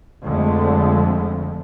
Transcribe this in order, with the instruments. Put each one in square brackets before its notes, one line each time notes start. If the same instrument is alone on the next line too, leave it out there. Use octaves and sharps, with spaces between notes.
[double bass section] F2 D3 F3 G#3 A3